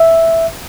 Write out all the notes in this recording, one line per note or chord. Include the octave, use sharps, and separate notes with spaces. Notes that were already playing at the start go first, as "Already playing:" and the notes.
Already playing: E5